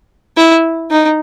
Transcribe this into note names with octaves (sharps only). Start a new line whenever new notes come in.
E4
D#4